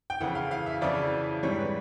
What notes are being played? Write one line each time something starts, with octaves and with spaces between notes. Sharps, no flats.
G5
F2 C#3 E3 F#5
F5
F5
E5
F2 C#3 E3 D5
G#2 E3 G3 C#5
B4